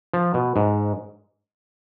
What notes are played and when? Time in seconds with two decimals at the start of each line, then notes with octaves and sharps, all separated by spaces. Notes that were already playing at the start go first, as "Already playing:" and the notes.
0.14 F3
0.34 B2
0.56 G#2